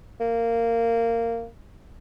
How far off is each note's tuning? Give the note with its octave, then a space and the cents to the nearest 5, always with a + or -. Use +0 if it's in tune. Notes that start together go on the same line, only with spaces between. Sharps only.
A#3 -15